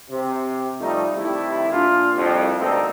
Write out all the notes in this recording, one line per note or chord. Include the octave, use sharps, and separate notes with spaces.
C3
F3 G3 A3 D#4
C3 D#3 G3 A3 E4
A#2 D4 F4
C2 F2
D2 G2 A#3 C4 D#4 A4